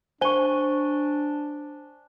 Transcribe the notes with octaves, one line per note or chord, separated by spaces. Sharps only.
D4 C5 G#5 C#6 G7